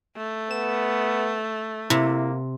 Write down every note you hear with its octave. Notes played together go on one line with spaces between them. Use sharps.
A3
B3 E7
C3 A#3 E4